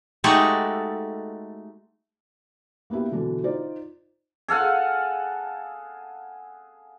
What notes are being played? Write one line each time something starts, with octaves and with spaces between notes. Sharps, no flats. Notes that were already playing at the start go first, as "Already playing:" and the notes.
G#3 A3 D#4 F#4 G4 A4
A#3 B3 D4 E4 G4
B2 D3 E3 D4
D#4 F4 C5 D5
G#4 A4 F5 F#5